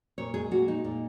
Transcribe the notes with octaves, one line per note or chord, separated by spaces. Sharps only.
A#2 C#5
G#3 G#4
A#2 F#4
G#3 D#4
A#2